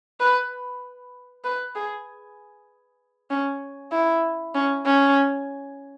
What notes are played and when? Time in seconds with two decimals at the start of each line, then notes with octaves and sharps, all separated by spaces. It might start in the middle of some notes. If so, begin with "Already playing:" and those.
0.20 B4
1.44 B4
1.75 G#4
3.30 C#4
3.92 E4
4.55 C#4
4.86 C#4